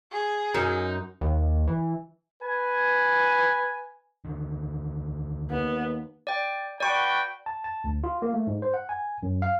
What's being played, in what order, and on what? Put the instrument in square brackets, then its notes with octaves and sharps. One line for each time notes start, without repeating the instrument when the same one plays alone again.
[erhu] G#4
[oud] F#2 [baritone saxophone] D#4
[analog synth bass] D#2
E3
[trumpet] B4 [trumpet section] G#5
[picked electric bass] D2 D3 D#3
[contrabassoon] D#2 [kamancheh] B3
[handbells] D5 G5
[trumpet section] F#4 B4 G5 [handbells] D5 C#6
[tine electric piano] A5
A5
D2
F4
A#3
A3
G#2
C5
F#5
G#5
F#2
F5